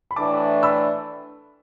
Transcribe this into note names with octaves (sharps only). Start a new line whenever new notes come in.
B5
A2 E3 A3 D4 A5 D6
B5 E6